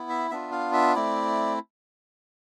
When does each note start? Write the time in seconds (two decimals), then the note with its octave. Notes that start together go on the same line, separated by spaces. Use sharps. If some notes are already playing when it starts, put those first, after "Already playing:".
Already playing: B3 E4
0.09 E5
0.31 B3 D4 F4 E5
0.52 F5
0.73 E5
0.95 A3 C4 E4 D5